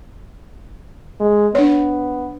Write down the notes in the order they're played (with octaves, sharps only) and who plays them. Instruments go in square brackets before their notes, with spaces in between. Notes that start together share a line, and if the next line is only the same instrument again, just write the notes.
[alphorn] G#3
[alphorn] B3 [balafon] D4 C#5